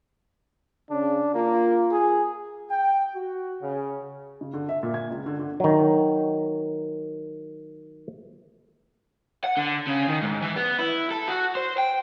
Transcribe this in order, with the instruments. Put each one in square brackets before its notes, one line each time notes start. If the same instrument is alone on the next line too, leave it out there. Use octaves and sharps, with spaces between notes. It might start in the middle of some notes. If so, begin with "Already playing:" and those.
[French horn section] C#3 [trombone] D4
[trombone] A#3 [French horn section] F4
[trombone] G#4
[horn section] G5
F#4
C#3
[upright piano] C#3
D3
E5
A#2
G#6
C#2
D3
D3
[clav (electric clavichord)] D#3 F#3
[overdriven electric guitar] F#5
D3
C#3
D#3
G#2
E3
B3
E4
A4
F#4
C5
G5